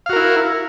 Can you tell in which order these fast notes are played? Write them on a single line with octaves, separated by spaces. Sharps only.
F5 F#4 A#4 E4